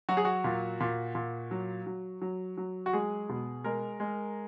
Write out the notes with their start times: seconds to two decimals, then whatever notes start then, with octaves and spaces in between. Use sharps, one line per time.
0.09 F#3 F#4
0.17 G#4
0.25 F#4
0.44 A#2
0.80 A#2
1.15 A#2
1.51 F#3
1.86 F#3
2.22 F#3
2.57 F#3
2.86 F#4
2.93 G#3 G#4
3.29 B2
3.64 G#3 A#4
4.00 G#3